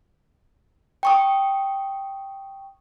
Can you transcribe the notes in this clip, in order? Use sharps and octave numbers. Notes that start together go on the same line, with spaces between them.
G5 C#6 D#6